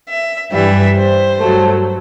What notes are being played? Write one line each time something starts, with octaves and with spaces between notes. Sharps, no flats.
E5
G2 E3 G3 E5
C5
G2 F#3 A3